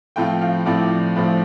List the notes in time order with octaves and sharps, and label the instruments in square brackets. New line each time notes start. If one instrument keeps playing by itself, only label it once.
[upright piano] A2 F3 C4 F4 G5
F5
A2 F3 C4 F4 D5
A2 F3 C4 F4